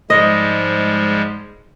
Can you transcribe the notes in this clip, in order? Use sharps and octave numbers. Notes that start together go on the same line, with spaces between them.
G#2 F3 G3 G#3 D#5